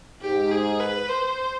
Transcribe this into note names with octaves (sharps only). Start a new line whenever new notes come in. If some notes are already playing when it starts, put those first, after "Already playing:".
G#2 G4
G#4
B4
C5